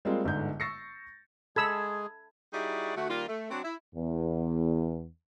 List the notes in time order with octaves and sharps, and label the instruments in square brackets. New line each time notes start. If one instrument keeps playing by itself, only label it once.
[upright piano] G3 G#3 A#3 C4 F4 G#4
G1 G#2 D3 G#3 G6
C#6 E6 A6 A#6 C7 C#7
[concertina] G#3 G#4 [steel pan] A4 B5 E6 [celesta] G#6
[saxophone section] G3 D#4 E4 F#4 G#4 D5
D2 A3 F#4
D#3 G3 A#3 F4
A3
F#3 C4 D4 F#4
E4
[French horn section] E2